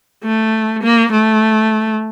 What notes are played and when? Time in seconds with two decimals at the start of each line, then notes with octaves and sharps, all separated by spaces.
0.24 A3
0.83 A#3
1.12 A3